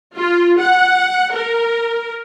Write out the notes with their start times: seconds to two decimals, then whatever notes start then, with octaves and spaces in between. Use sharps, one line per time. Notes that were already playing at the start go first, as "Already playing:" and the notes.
0.17 F4
0.59 F#5
1.34 A#4